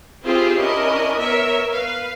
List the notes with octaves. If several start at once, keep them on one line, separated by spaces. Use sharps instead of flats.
C4 E4 F4 G4 G#4 C5
C#4 D4 E4 A#4 D#5
B3 A#4 C#5 E5
B4 F5